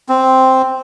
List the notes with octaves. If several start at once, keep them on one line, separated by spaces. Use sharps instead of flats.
C4